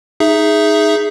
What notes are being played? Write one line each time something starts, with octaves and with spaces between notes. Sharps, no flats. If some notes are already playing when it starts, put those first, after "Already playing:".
D#4 G#4 E5